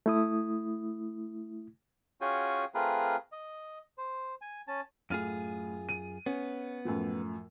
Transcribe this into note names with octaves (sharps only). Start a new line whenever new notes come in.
A3 E4 D#6
C#4 F4 F#4 G#4 G5 G#5
A3 C4 F4 G#4 A#4 B4
D#5
C5
G#5
C#4 A5
F#2 A2 F4 G#4 F6 D#7
D#7
B3 C#4
F#2 A2 F3